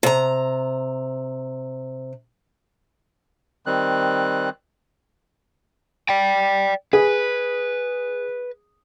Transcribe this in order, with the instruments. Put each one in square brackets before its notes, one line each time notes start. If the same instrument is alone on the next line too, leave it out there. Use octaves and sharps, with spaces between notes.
[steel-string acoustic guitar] C3 A#5
[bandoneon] D#3 G3 C4 F#6
[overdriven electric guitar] D5 G5
[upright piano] G#4 [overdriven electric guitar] B4